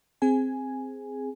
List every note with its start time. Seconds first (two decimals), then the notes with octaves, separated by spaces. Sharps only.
0.22 C4 G#4 G#5